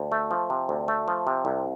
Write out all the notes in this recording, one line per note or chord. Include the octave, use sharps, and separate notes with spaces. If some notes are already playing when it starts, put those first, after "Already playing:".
Already playing: D2
A3
F3
C3
D2
A3
F3
C3
C2